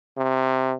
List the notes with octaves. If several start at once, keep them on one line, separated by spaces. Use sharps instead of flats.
C3